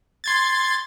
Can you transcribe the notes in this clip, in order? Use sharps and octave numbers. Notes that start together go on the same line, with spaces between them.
C6 G#6 A6